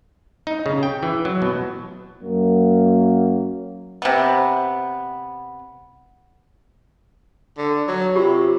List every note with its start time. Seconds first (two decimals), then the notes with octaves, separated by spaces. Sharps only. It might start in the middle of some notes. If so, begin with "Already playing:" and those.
0.47 D#4
0.66 C#3
0.83 G5
1.03 E3
1.25 F#3
1.42 B2
2.23 F#2 F#3 A#3
4.02 C3 B3
7.58 D3
7.88 F#3
8.16 C3 F4 G4